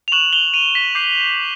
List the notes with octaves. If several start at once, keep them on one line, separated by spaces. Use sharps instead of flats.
F7
C#6 F#6 E7 F#7
F7 G7
D#7 F7
B6
D6 G6 C7